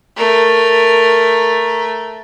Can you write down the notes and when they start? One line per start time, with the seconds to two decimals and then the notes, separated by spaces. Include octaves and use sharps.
0.16 A3 A#4